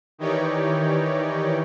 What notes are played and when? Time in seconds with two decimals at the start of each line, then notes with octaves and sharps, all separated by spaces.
0.18 D#3 E3 D#4 G4 C#5 D5